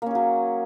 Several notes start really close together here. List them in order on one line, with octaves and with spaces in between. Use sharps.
A#3 C#4 G#4 F#3